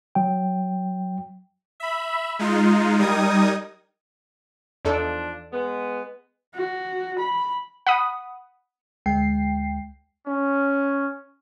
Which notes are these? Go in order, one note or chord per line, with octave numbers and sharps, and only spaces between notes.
F#3 G5
E5 B5
G#3 D#4 F4
G3 D#4 A#4 D#6 G#6
E2 F3 D4 D#4 A4
G#3 B3
F#4
B5
F#5 B5 D#6
D2 G#3 G5 C7
C#4